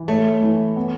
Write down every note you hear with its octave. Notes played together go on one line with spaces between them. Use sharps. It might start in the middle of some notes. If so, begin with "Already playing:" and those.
Already playing: E3
A3 C#5
E3
B3